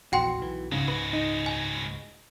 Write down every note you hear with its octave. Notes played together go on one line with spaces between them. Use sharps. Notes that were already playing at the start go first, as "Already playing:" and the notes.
A#1 E2 F#4 F#5 G5 C6
B1 E3
C#2 G#2 C#3 G#3 F#4
B4
D#4
G#5